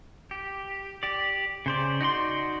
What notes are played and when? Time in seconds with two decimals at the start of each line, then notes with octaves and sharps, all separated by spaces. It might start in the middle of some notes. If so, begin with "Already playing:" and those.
0.31 G4
1.03 G4 D5
1.66 C#3 C5 D5
2.01 D#4 F#4 D5 C6